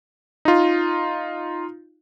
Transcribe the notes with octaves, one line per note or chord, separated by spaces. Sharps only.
D#4 F4